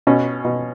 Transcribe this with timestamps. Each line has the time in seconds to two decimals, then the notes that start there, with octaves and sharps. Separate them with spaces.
0.07 B2 C#4
0.45 B2